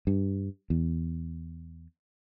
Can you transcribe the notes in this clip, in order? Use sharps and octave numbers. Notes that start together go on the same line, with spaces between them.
G2
E2